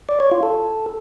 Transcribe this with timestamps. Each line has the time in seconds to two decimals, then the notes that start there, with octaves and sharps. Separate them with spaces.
0.09 D5
0.20 C#5
0.31 F4
0.43 A4